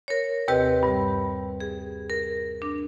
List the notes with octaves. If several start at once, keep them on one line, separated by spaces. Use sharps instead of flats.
A#4 C#5
D#2 C3 C4 G4 B4 D#5
G2 G3
G#4
A#4
D4